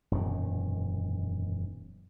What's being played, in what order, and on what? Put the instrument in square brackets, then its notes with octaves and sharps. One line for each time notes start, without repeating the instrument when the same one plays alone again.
[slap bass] E1 F#2 A#2 D#3